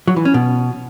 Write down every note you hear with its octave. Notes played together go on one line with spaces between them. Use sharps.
F#3
E3
C#4
B2